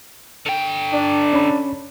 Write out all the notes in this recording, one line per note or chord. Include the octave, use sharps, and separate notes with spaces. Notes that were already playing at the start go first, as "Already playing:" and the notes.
D3 G5
D4
C#4 C#5 B5